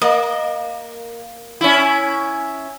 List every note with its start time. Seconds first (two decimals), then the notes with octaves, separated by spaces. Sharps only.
0.02 A#3 D#5
1.61 C#4 E4